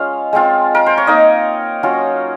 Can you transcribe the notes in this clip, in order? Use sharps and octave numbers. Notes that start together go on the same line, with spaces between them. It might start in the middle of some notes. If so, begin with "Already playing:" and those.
Already playing: G#3 C#4 F4 F5
G#3 C4 F4
A#4
C5
C#5
A#3 D#4 D#5
F#3 C#4 F4